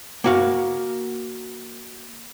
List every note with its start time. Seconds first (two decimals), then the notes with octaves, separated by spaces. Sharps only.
0.24 A#3 F#4 F5